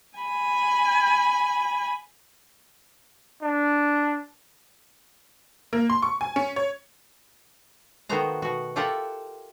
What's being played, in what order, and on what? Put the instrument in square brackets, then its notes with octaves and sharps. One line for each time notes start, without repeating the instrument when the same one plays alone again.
[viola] G#5 B5
[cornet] D4
[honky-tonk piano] A#3
C6
C#6
G#5
C#4
C#5
[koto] D#3 A3 B3 F#4 C5 A#5
B2 F#4
F4 G4 A4 A#4 E5 F#5